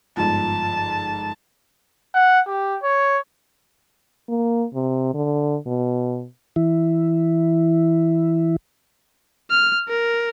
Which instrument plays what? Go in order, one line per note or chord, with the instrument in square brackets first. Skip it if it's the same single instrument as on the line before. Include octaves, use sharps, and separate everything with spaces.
[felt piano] G1 G#2 F3 [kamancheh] A5
[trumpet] F#5
G4
C#5
[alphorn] A#3
C3
D3
B2
[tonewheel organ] E3 E4
[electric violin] F6
A#4